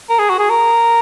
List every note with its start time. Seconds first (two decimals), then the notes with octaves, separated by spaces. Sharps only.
0.09 A#4
0.19 G#4
0.30 F#4
0.39 G#4
0.50 A#4